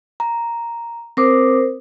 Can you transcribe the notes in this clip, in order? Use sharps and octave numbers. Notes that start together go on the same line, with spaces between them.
A#5
C4 A#4 C5 D6 D#6